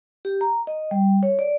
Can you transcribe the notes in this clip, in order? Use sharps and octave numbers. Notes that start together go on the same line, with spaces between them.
G4
A#5
D#5
G3
C#5
D5